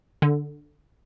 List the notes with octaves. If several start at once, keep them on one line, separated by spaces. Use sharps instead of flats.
D3